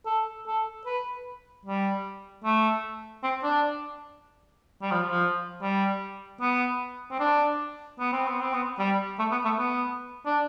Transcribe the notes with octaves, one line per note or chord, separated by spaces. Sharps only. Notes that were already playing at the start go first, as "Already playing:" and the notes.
A4
A4
B4
G3
A3
C4
D4
G3
F3
F3
G3
B3
C4
D4
B3
C4
B3
C4
B3
G3
A3
B3
A3
B3
D4